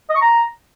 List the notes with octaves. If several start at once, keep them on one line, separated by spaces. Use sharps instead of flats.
D#5
C#6
A#5